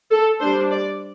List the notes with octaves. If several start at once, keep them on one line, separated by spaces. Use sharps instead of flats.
A4
G3 D4 C5
D5